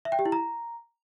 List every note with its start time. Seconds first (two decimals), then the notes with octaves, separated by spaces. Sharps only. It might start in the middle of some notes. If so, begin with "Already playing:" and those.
0.05 E5
0.12 G5
0.19 G4
0.26 E4
0.32 A#5